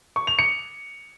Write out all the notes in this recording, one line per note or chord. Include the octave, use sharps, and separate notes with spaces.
C#6
F7
C#7